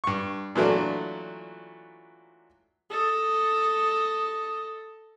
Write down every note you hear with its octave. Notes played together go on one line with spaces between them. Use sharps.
G2 C#6
A#2 E3 F#3 A3 D4
A4 D#5